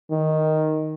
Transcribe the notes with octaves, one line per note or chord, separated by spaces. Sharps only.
D#3